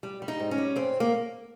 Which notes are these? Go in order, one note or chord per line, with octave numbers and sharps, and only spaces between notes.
G3
G3
D#4
G#2
C#4
G3
G2 C4
A#3